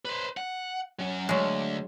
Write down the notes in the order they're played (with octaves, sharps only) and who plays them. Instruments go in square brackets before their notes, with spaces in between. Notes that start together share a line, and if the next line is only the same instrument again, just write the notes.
[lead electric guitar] B4 C5
F#5
F#3 C#4
[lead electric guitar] D2 [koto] F#3 G#3